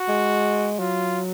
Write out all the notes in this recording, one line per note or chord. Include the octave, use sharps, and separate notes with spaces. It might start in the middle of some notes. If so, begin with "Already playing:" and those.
Already playing: F#4
G#3
F#3 F4